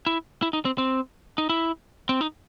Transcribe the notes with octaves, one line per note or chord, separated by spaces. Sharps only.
E4
E4
D#4
C4
C4
D#4
E4
C4
D#4